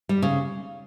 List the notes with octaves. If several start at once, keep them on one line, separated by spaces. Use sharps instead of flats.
G3
C#3